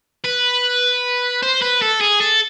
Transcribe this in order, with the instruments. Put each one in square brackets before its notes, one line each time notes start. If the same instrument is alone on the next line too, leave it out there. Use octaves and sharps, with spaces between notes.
[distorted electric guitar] B4
C5
B4
A4
G#4
A4